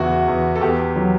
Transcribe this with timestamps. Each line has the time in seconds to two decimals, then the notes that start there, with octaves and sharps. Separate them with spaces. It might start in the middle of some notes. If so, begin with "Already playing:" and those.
Already playing: E2 C#3 E3 E4 F#4
0.28 E2
0.55 A4
0.61 E2 G4
0.96 F#3